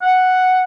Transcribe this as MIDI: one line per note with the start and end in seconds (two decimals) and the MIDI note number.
0.02 0.63 78